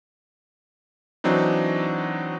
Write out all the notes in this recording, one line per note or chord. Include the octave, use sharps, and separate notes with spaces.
E3 F#3 C4 D4 D#4